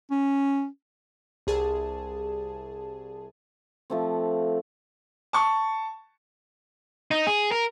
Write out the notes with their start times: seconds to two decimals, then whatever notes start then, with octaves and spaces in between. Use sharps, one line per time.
0.11 C#4
1.47 C2 G#4 A5
3.90 F3 A3 C4
5.33 A5 C#6
7.11 D#4
7.27 G#4
7.52 A#4